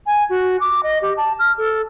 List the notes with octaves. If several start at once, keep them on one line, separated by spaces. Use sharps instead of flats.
G#5
F#4
D6
D#5
G4
A5
F6
A4